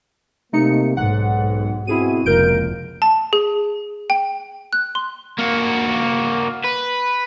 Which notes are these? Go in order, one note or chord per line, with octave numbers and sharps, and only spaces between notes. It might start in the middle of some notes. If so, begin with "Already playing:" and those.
C3 A3 A#3 D#4 C#7
B1 G#2 F#5
B2 C4 E4 F#4 G#4 D#7
F1 C#2 A#3 A#4 G6 D7
A5
G#4
G5
F#6
C6
A#3 F#4
B4